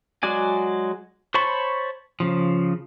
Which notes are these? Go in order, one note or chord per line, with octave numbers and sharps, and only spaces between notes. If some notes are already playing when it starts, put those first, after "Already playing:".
F#3 G#3 F#4 D5 G#5
C5 C#5 A5 B5 C#6
C#3 F3